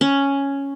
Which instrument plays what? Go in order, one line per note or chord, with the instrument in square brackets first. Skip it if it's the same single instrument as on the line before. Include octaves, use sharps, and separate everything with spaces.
[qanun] C#4